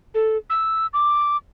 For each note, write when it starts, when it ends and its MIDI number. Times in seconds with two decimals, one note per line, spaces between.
0.14 0.37 69
0.50 0.87 88
0.93 1.37 86